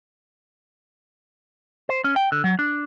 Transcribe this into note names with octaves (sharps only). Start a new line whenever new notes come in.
C5
C#4
G5
D3
F#3
D4